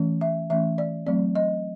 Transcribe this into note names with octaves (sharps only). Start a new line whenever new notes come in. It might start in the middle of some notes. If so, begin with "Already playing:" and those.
Already playing: E3 A3 C#4
E5
E3 A3 C#4 E5
D5
F#3 A3 C4 D5
D#5